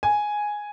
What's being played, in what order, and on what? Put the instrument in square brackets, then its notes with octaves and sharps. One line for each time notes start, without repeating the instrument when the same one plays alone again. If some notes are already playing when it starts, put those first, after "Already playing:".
[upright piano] G#5